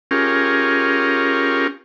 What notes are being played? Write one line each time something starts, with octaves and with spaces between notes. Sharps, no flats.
C#4 F4 G4 G#4 A#4